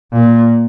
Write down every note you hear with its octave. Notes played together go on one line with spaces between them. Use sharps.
A#2